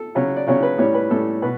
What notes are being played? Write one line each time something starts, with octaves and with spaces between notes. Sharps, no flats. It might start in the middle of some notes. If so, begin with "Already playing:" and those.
Already playing: A4
C#3 F#3 C#4
D5
C#3 F#3 C#4 C#5
B4
A2 G3 C#4 C#5
B4
A2 G3 C#4 A4
B2 B4